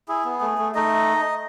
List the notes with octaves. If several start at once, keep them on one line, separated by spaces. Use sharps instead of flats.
E4 G#4
B3
A3
A3
A3 D#4 D#5